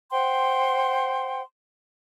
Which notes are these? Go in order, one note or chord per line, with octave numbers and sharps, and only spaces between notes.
C5 F#5 G5 C6